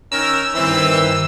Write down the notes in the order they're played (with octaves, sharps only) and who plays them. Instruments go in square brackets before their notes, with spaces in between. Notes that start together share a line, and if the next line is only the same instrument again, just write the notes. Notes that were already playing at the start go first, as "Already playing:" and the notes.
[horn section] D#3 C#4 A#4 [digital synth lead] E6
[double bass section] G2 D#3 [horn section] E3 C4